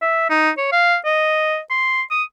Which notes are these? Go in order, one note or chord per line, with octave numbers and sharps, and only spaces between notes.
E5
D#4
C#5
F5
D#5
C6
D#6